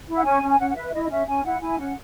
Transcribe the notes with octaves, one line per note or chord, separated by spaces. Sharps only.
E4
F#5
C#4 G#5
C#4
G#5
C#4 F#5
F#5
B4 E5
E5
E4 D#5
D#5
C#4 E5
C#4 G#5
E4 F#5
E4 G#5
C#4 F#5